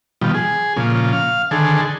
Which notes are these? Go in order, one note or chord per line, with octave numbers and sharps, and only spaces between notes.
B2 D#3 F3 G3
G#4
A#2 C#3 F3
F5
D3 D#3 G#4 A4